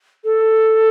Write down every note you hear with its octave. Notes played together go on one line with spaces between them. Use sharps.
A4